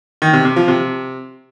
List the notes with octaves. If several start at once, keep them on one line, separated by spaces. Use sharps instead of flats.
D#3
C3
C3
F3
C3